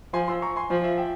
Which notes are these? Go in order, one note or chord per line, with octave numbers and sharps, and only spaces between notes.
F3 G#5 C6
C6 E6
A#5 C#6
G#5 C6
F3 F5 G#5
E5
E5 G5